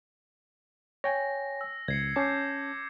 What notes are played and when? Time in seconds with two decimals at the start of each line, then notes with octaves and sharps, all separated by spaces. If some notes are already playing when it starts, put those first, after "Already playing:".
1.04 C#5 G5 G#5 A#6
1.61 E6
1.88 C#2 G#6 C7 C#7
2.16 C#4 A5 D6 G6 C7